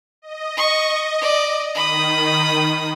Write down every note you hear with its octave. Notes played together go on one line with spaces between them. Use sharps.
D#5
C#6
D5
D#3 B5 D#6